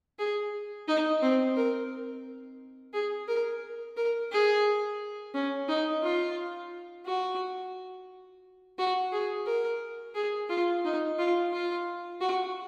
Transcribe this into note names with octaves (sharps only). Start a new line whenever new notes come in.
G#4
D#4
C4
A#4
G#4
A#4
A#4
G#4
C#4
D#4
F4
F#4
F#4
G#4
A#4
G#4
F4
D#4
F4
F4
F#4